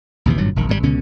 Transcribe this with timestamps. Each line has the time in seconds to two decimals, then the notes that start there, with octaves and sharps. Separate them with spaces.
0.26 A#1 D#2 C3 E3
0.38 G#1 G2 A#2 F#3
0.56 E1 B1 D#3
0.69 G#1 G2 B2 G3
0.83 C#2 B2 D3 C#4